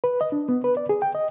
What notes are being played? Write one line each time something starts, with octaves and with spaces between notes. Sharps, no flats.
B4
D#5
D4
B3
B4
D5
G#4
G5
D#5